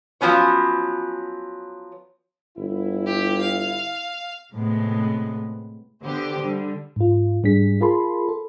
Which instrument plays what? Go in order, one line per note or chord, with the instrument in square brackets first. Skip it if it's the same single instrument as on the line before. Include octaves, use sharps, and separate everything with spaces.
[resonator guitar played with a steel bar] F3 F#3 B3 C#4 C#5
[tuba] G1 [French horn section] E4
[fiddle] G4
F5
[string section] A2 C3 G#3 B3
D3 B3 G4 C5
D3 G3
[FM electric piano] G#2 F4
G#2 G3 D4 G#4 B6
F4 G#4 A#4 A5 B5 C6
A4